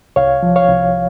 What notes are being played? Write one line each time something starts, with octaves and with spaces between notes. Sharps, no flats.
C2 C#5 F5
F3
C#5 F5
C2